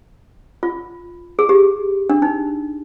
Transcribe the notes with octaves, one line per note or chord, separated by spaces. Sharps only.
F4
G#4
G4
D4
D#4